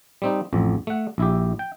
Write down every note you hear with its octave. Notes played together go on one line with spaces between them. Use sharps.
G3 C4 D#4
A1 F2
A3 F#5
A#1 E4 G4
G5